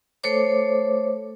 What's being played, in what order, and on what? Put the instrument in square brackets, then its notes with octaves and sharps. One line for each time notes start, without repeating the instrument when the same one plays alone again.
[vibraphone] A3 A4 C5 C#5 D6